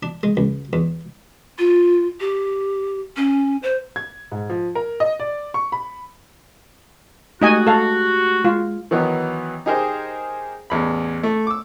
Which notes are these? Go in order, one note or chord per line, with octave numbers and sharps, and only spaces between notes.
D4
G#3
C#2
E2
F4
G4
C#4
C5
G#6
G#2
F3
A#4
D#5
D5
C#6
B5
G#3 A3 D#4 F#4 G4 D#5 G#5
A4 F5
G#3 F4
D#3 E3 F#3 B3 D#4
D#4 G4 G#4 A#4 C5 D#5
A1 E2 B5
A3
D6 E6